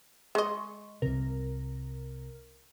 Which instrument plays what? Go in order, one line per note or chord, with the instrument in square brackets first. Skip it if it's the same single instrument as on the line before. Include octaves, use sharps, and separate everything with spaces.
[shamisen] G#3 D#5 [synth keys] C6 C#6
[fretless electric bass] C2 C3 [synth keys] A#4